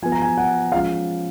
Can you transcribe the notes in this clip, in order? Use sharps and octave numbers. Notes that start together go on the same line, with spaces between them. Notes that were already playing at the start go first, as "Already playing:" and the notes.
F3 B3 G#5
A#5
G#5
F#5
F3 G#3 C#4 F5